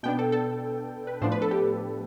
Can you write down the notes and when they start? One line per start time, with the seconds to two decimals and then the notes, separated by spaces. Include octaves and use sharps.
0.03 B2 B3 D4 G5
0.19 A4
0.32 A4
1.07 B4
1.21 A2 F3 B3 D4 C5
1.32 B4
1.42 A4
1.51 G4